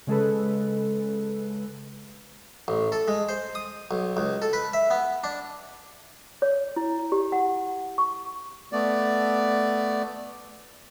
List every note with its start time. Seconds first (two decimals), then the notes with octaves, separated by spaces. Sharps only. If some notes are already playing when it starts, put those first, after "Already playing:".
0.07 C#3 G#3 A4 B4
2.68 A1
2.92 A4
3.08 G#3
3.29 C5
3.55 D#6
3.91 B1
4.17 C#2
4.42 A4
4.53 B4
4.73 E5
4.91 B3
5.24 D4
6.42 C#5
6.76 E4
7.12 G4
7.32 F#5
7.98 C#6
8.72 A3 B3 D5